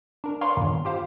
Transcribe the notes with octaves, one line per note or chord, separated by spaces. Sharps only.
D4 A#4
A#4 B4 C#5 D5 F5 C6
E2 G2 A#2 D3 D#3
F4 G4 C5 F5